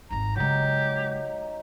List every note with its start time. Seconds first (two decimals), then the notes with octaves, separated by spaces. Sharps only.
0.10 G#1 D#2 A#5
0.36 C#3 F#3 G#3 D#4 G4